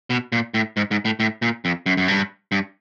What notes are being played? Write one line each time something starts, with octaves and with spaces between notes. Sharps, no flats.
B2
A#2
A2
G#2
G#2
A2
A2
A#2
F2
F#2
F#2
G2
G2